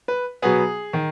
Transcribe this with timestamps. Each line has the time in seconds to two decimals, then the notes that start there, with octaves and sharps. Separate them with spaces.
0.08 B4
0.42 B2 F#3 B3 G#4
0.93 D#3